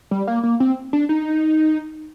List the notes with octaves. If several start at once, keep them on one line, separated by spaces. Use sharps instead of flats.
G3
A#3
A#3
C4
D4
D#4